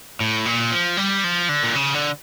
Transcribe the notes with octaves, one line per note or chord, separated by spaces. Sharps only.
A2
A#2
F3
G3
F3
D3
A#2
C#3
D3